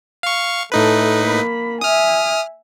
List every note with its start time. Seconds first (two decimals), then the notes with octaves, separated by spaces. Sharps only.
0.23 F5 C#6
0.72 A2 A3 D#4 A4 B4
1.19 A#3 B5
1.81 E5 G#5 D#6 F6